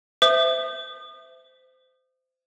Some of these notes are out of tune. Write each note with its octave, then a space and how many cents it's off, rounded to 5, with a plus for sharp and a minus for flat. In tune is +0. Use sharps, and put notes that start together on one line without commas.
C5 -20 E5 +0 D#6 -35